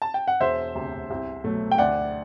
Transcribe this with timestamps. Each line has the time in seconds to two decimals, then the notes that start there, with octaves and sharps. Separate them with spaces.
0.02 A5
0.14 G5
0.28 F#5
0.41 E1 C5 E5
0.75 D2 C3
1.10 C2
1.44 B2 F#3 A3
1.71 G5
1.78 D2 D5 F#5